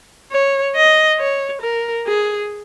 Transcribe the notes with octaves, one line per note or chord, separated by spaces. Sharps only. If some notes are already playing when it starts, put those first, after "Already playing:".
C#5
D#5
C#5
A#4
G#4